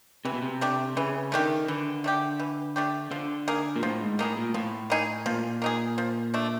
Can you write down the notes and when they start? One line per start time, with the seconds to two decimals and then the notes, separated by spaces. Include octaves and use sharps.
0.25 C3 E3
0.33 B2
0.42 C3
0.61 A3 D4 G4
0.96 C#3 E3
1.32 D#3 A3 D4 G4
1.68 D3 E3
2.04 A3 D4 G4
2.40 E3
2.76 A3 D4 G4
3.11 D3 F3
3.48 A#3 D#4 G#4
3.76 A#2
3.83 A2 F3
4.01 G#2
4.19 A2 A#3 D#4 G#4
4.37 A#2
4.54 A2 F3
4.90 A#3 D#4 G#4
5.26 A#2 F3
5.62 A#3 D#4 G#4
5.98 F3
6.34 A3 D4